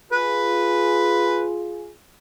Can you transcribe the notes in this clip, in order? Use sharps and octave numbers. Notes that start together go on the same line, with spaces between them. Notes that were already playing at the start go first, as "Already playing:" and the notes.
F4 G#4 B4